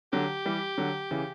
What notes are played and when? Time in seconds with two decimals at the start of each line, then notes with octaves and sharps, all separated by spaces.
0.12 D3 F#3 G4
0.45 E3 G3
0.78 D3 F#3
1.11 C#3 E3